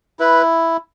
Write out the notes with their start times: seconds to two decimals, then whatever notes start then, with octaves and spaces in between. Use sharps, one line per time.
0.19 E4 B4